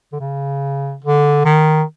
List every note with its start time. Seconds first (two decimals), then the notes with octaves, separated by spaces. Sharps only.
0.13 D3
0.20 C#3
1.04 D3
1.45 D#3